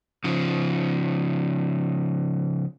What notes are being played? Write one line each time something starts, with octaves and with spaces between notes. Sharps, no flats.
C#3 F3